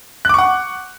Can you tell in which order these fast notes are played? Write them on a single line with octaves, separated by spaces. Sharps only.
F#6 D6 C#6 F#5